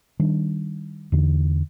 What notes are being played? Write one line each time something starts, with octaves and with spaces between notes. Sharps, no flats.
D#3 G3 D4
E2 D3